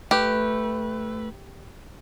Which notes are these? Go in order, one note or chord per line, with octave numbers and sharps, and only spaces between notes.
A3 G4 B4